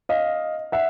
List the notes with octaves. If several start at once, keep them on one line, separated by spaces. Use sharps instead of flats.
D#5 F5
E5 F#5